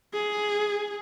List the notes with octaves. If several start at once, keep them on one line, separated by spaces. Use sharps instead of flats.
G#4